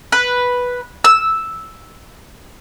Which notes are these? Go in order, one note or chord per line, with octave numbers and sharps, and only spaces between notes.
B4
E6